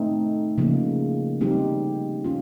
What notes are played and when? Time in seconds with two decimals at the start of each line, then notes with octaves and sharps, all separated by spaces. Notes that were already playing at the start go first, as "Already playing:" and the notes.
Already playing: A3 C4 D#4
0.58 C#3 F3 A#3
1.41 G3 C4 D#4 G4
2.24 C#4 F4